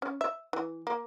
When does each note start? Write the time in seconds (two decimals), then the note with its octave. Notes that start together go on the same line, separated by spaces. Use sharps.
0.02 C#4
0.21 E5
0.53 E3
0.87 A#3